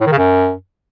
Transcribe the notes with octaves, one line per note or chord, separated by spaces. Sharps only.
A2
D#3
C#3
F#2